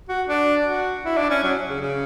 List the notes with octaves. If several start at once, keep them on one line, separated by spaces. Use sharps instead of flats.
F#4
D4
F#4
E4
D4
C#4
F#3
C#3
C#3